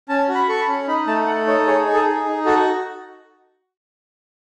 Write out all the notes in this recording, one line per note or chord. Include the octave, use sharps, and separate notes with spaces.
C#4 A5
F#4
B5
A4 C#6
B5
C#4
D#4 B5
A3 A5
A4 F#5
D#4 C#5
G#4 C#5
D#4
A4
G#4
D#4
F#4 A4